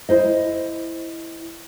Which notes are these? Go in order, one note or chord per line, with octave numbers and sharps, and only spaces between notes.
E4 C5 D#5